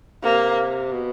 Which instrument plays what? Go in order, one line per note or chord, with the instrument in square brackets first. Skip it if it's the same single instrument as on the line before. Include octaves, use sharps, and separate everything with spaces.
[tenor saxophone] C3 [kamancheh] A#3
[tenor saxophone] B2